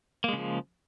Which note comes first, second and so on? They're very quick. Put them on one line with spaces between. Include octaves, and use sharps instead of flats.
A#3 G#3 C#3 F3